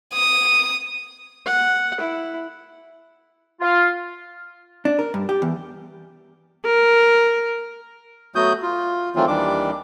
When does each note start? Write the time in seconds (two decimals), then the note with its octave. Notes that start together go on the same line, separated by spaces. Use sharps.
0.14 D#6
1.46 F#5
2.00 E4
3.61 F4
4.85 D4
4.99 A#4
5.14 G2
5.29 G4
5.42 E2
6.65 A#4
8.35 F#3 A3 B3 F#4 D#6 G6
8.62 F4
9.16 D#3 E3 F#3 A3 C4 F4
9.27 D#2 D#3 E3 G3 D4 D6